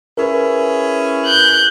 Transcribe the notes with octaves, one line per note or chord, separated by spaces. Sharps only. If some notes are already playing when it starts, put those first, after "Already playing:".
C#4 E4 G#4 A#4 B4
F#6 G6